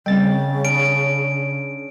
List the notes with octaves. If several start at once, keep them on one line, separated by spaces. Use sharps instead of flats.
C#3 G3 C4 G5 A6
C#4 D4 G#4 D7